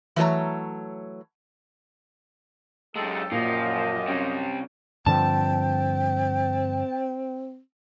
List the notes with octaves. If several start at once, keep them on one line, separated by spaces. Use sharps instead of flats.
E3 F#3 A3 C#5 A#5
F#2 G#3 G4 A4
F#2 A#2 F3 F4 G4 D#5
C3 G3 C#4
G2 D3 F3 C4 G5 A5